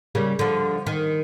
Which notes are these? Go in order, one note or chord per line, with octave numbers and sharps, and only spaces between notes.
C#3 G3 A#3
D3 F3
D#3